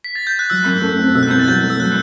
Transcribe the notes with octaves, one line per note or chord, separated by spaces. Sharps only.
B6
A6
G6
F#6
F#3 E6
F#2
A3
C4
B2 E6
F#6
C2 G6
A6
F#3 G6
A3
E6
F#3 F#6